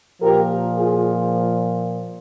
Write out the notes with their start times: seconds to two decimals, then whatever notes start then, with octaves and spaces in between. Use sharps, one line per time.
0.22 A#2 F3 G4 A#4
0.77 F4 G#4